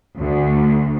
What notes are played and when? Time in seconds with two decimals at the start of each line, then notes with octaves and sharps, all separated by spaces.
0.19 D2